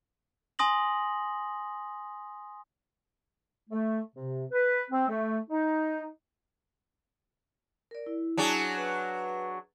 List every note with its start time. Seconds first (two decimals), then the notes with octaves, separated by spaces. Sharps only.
0.59 G#5 C6 D#6 A#6 F#7
3.70 A3
4.16 C3
4.52 B4
4.91 C4
5.08 A3
5.49 D#4
7.91 A#4 D5
8.06 E4
8.38 F#3 D4 G#4
8.77 B4